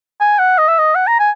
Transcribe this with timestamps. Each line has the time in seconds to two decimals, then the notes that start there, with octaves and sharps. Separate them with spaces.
0.20 G#5
0.39 F#5
0.58 D#5
0.68 E5
0.79 D#5
0.95 F#5
1.07 A#5
1.19 G#5